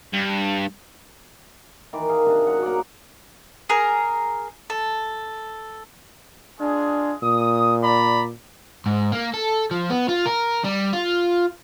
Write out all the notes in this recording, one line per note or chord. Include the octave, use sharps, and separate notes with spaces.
G2
D#3 E3 D6
G#4 F5
C3 D4 D#5
F#2 F#5
A#3 F#5 A#5 D6
G#4 A#4
A4
G#3 D4 F4 G#4
A#2 D#6
D5 A#5 B5
G#2
A#3
A4
F3
B3
F4
A#4
G3
F4